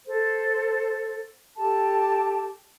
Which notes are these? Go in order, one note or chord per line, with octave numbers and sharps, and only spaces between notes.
A4 C5
G4 A4 A5